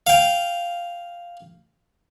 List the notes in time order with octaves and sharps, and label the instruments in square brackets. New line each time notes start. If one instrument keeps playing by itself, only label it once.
[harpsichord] F5 G5